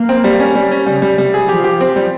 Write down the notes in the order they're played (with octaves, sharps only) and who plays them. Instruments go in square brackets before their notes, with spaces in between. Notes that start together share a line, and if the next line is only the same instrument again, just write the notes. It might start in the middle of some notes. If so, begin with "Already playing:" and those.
Already playing: [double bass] A#3
[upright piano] C4
G3
C#4
G3
C#4
[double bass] C#3 [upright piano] G3
[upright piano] G3
[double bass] C3 [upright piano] G3
[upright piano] G#4
[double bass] F3 [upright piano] G4
[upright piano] G4
C4
G3